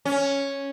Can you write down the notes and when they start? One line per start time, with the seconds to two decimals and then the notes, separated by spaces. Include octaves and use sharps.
0.05 C#4